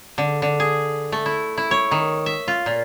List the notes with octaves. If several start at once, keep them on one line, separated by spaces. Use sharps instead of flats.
D3
D3
G#4
A3
E4
E4
C#5
D#3
E5
F4
A#2